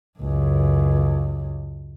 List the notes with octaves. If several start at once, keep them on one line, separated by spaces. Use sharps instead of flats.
C#2 F#2